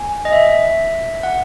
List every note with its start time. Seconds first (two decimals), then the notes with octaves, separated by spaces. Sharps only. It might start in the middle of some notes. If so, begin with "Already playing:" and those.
Already playing: G#5
0.25 D#5
0.33 E5
1.23 F#5